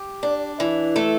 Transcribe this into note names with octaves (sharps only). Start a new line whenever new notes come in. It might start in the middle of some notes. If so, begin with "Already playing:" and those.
Already playing: G4
D4
E3
A3 A4